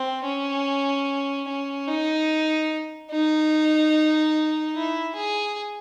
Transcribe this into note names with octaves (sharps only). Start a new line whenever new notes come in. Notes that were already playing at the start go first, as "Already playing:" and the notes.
Already playing: C4
C#4
C#4
D#4
D#4
E4
G#4